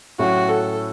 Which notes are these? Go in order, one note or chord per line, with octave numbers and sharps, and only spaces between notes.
A2 F#3 C#4 F#4
A4